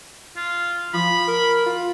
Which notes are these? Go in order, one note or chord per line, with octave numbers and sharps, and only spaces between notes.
F4
F3 B5
A#4
F4